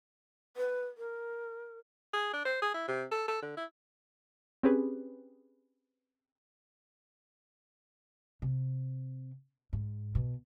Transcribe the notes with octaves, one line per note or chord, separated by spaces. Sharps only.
B4
A#4
G#4
D4
C5
G#4
E4
C3
A4
A4
D3
E4
C4 C#4 G4 G#4 B4
C3
G#2
B2